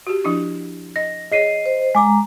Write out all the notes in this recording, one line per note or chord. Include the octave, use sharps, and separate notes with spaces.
F#4 G4
F3 D4 E4
D#5 A#6
G#4 C#5 D#5 C7 D#7
C5
G#3 G#5 A#5 D6